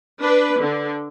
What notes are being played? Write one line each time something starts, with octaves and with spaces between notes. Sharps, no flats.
D4 B4
D3